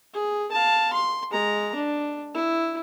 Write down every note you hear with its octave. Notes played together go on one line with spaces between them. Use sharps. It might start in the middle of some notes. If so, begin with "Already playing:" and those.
G#4
F5 A5
C6
G#3 A#5
D4
E4